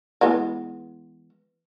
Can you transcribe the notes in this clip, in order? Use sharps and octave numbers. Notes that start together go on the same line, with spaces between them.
E3 G#3 B3